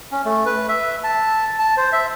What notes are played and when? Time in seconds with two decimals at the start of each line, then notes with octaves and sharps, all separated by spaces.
0.12 C#4
0.25 A3
0.46 B4
0.68 E5
1.04 A5
1.59 A5
1.77 C5
1.92 E5